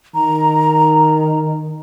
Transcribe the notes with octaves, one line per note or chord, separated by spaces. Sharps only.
D#3 A#5